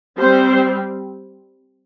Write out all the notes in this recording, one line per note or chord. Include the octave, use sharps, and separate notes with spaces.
G3 C4 C5